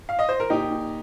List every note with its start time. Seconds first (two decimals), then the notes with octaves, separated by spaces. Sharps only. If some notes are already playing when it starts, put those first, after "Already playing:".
0.09 F5
0.19 D#5
0.29 C5
0.40 A#4
0.50 A#2 D#4 G4
0.71 A#2